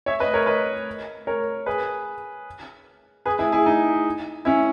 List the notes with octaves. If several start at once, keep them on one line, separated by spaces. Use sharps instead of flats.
C#5 E5
B4 D#5
A#4 C#5
B4 D#5
A#4 C#5
G#4 B4
G#4 B4
E4 G#4
E4 G#4
D#4
C#4 E4